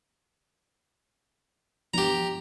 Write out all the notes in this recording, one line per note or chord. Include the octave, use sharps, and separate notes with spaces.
F3 B3 D4 G4 A#5